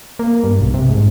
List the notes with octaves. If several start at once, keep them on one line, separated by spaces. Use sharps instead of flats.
A#3
G2
B1
C3
G#2